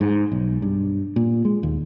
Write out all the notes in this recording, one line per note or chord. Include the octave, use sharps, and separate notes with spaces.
G#2
B1
G2
A#2
G#3
D#2